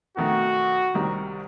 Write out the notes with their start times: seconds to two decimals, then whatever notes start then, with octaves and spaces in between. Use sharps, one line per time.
0.17 B2 D#3 A3 F#4
0.94 C2 D#3 G4